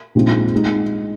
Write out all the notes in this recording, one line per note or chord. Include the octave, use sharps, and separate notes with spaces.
A#1 G#2 G#3 C4 F4
G#3 D#4